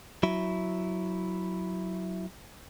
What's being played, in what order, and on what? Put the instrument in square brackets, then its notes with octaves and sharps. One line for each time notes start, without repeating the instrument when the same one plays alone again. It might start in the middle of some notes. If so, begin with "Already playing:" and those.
[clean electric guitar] F#3 E4